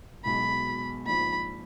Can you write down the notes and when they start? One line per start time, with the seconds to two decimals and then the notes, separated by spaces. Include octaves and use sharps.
0.25 B1 B2 G#3 B5
1.07 A#1 G#2 F3 B5